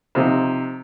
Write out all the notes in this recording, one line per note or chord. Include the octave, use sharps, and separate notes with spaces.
C3 F3 D#4